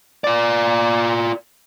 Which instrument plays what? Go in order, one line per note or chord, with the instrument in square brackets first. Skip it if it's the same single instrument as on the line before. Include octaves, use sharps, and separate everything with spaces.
[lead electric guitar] F4 D5